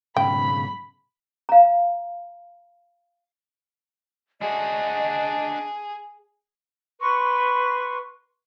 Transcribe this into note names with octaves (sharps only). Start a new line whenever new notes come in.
B1 G#2 C#3 G5 B5
F5 A#5
D4 F#4 G#4 D#5
B4 C6 C#6